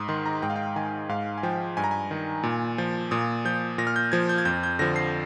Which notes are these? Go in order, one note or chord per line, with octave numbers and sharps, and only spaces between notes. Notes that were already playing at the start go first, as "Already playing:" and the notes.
Already playing: G#2 D#6
D#3 C6
A#5
G#2 G5
F5
G5
D#3 G#5
G#2 F5
G#5
F3 G5
G2 G#5
A#5
G#5
D#3
A#2
F3
A#2 D#6
F3 G6
A#2 A#6
F6
G6
F3 G#6
G6
G#6
F2 G6
G6
D3 F3 A#6
C7